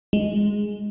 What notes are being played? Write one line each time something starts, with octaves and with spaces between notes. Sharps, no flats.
G#3